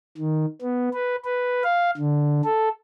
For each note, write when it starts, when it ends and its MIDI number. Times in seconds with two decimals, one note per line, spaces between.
0.18 0.46 51
0.62 0.89 59
0.94 1.16 71
1.25 1.63 71
1.64 1.91 77
1.97 2.41 50
2.44 2.69 69